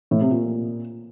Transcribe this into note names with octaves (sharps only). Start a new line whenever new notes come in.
A2
C3
A#2